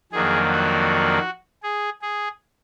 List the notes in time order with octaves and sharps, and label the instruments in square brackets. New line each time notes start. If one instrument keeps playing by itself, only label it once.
[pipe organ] F2 D#3 F#3 A#3 D4 G#4
F#4
G#4
G#4